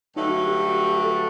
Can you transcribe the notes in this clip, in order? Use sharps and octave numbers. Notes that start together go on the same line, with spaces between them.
G2 D3 F#3 A3 D#4
F#4
G4
A4